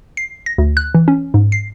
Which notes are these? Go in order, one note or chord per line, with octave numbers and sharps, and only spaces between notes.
C7
A#6
D2
F#6
E3
C#4
G#2
C7